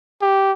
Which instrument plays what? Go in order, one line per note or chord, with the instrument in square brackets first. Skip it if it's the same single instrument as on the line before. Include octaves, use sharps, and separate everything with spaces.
[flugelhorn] G4